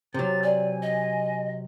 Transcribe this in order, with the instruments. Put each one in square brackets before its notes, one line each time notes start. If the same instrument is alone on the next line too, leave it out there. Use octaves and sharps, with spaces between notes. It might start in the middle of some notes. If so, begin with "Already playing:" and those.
[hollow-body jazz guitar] C3 F#3 [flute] A6
[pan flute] D5 [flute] G#5
[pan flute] D#5